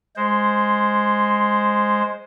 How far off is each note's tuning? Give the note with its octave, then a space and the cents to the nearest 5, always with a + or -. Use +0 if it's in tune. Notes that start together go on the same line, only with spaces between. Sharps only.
G#3 +0 C5 +0